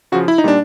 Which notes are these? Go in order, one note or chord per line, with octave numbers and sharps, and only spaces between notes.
C#3 F3 F#4
E4
D#4
A#2 G3 D4